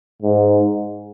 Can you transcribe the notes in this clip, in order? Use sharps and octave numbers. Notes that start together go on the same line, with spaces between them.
G#2